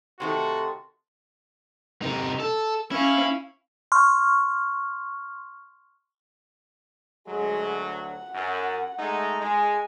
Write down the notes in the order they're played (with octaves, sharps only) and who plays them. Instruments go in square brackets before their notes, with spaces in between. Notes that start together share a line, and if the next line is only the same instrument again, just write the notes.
[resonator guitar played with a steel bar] C3 D#3 A3 [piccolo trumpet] F#4 [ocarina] C6
[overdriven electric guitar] C3 D#4
A4
[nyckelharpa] C#4 F5 [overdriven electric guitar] E4
[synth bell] C6 C#6 F6
[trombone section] D2 F#3 [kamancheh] G#3
[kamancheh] F#5
[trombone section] F#2
G#3 A3 D#4
[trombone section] G#3 [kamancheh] G#5